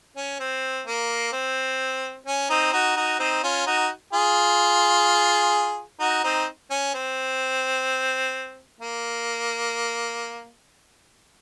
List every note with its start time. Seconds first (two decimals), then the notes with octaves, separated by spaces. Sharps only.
0.16 C#4
0.39 C4
0.87 A#3
1.32 C4
2.26 C#4
2.50 C4 D#4
2.73 D#4 F#4
2.96 D#4 F#4
3.19 C4 D#4
3.43 C#4 F4
3.66 D#4 F#4
4.13 F4 G#4
6.00 D#4 F#4
6.24 C4 D#4
6.70 C#4
6.94 C4
8.81 A#3